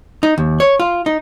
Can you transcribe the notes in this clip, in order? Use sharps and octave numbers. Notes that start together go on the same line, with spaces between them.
D#4
D#2
C#5
F4
D#4